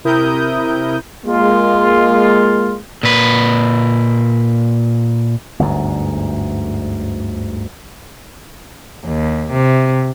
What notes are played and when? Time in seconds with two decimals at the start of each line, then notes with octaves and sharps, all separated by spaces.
0.04 C3 E4 A#4 D#6 G6
1.25 G#3 A#3 F4
3.03 A#2 B4
5.59 G1 D2 G#2
9.05 D#2
9.53 C3